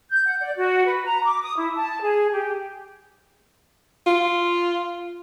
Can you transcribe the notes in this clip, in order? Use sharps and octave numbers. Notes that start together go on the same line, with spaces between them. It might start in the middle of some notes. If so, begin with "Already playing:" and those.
G6
F#5
D5
F#4
B4
A#5
D6
D#6
E4
A5
G#4
G4
F4